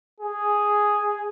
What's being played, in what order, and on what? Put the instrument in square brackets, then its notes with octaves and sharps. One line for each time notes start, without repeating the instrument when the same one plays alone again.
[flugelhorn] G#4